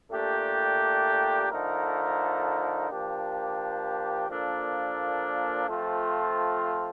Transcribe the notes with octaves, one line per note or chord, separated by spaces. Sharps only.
A#2 A3 D4 G4
D3 F3 A3 D#4 A#4
F3 A#3 D4 G4
A#2 F3 A#3 D4 A4
F3 A3 C4 F4